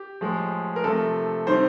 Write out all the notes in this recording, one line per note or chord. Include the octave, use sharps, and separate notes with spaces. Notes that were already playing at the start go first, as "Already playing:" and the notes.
Already playing: G4
A2 F3 G#3
A#4
C3 F3 A3 A4
C3 D#3 G3 C5